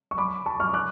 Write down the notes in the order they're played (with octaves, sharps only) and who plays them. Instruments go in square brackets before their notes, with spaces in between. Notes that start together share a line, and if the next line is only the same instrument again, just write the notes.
[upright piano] C#6
B5 D6
A5 C#6
C#6 F6
D6 F#6